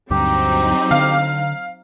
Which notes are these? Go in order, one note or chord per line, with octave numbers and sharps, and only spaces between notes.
D2 G2 F#3 C4 D#4 G4
D3 F5